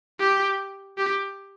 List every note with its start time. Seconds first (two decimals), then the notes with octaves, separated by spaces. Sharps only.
0.19 G4
0.98 G4